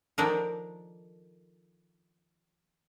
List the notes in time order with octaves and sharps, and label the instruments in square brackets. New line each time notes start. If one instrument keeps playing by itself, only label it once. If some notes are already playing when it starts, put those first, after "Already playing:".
[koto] D#3 F3 D4 A4 A#4